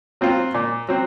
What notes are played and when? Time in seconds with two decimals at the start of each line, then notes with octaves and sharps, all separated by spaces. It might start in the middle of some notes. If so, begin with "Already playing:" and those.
0.21 F#3 C4 F4
0.54 A#2
0.89 F#3 C4